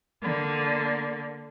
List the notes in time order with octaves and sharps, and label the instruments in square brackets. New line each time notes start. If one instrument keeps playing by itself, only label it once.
[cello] D3 A#3